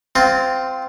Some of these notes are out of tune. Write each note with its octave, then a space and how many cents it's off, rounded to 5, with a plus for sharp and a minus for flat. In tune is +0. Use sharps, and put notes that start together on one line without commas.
C4 -15 F4 +0